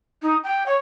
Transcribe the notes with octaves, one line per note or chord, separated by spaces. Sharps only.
D#4
G5
C#5